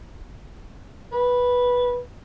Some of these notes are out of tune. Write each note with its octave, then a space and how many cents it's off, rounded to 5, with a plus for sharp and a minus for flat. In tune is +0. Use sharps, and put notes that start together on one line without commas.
B4 -10